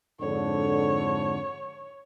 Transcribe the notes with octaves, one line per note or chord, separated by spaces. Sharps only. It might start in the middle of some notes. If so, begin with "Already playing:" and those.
F2 G#2 D3 C#5